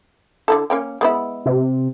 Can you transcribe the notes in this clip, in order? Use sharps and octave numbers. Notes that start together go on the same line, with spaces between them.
D3 E4 A4
A#3 C#4 G5
G#3 B3 E4
C3